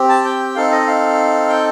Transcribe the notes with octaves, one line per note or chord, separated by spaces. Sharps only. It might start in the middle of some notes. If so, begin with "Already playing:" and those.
Already playing: C4 G4
A5
G5
C4 D#4 A4 F5
D#5
F5
G5